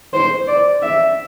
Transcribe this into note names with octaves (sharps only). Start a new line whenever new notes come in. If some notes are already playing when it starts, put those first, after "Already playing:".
C5
D5
E5